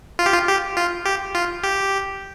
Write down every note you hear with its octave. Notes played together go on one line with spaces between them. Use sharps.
F4
G4
F4
G4
F4
G4
F4
G4